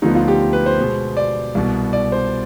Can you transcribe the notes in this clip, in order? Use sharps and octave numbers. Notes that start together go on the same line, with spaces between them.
D2 D3 F3 B3 D#4
F4
G4
B4
C5
B2 G#3 B3
D5
C2 B2 B3
D5
C5